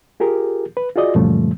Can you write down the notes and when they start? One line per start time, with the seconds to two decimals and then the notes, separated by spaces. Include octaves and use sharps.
0.20 F4 G4 G#4 A#4
0.77 B4
0.96 F4 F#4 G#4 D5 D#5
1.15 F#2 A#2 C#3 F3 G3 A3